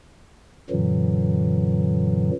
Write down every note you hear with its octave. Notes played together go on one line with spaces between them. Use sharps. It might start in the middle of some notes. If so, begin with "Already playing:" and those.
F#2 A#2 D3 E3 F#3